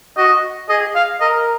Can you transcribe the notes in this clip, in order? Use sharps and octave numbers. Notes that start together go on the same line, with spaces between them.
F#4 D#5
G#4 D#5
F5
A#4 D#5